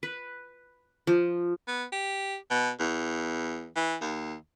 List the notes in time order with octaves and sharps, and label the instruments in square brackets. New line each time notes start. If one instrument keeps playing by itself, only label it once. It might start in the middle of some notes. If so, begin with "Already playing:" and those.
[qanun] B4
F3
[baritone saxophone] B3
G4
B2
E2
E3
D#2